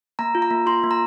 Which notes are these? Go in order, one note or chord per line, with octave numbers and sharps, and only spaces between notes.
A#3 A#5
F4
A#5
A#3
F4 C6
A#3
A#5